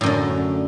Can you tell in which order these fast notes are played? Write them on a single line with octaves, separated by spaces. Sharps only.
A2 F#2 D3